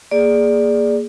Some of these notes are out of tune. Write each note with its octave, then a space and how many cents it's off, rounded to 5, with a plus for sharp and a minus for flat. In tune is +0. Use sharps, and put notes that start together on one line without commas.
A#3 +0 G#4 +0 D5 +0